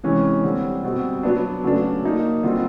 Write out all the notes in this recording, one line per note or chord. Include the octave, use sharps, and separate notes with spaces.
C3 E3 G#3 C#4
D3 G3 C4
B2 G3 C4
F#3 B3 D4
C#3 F#3 A3 D4
F#3 A#3 D#4
D3 G3 C4 F4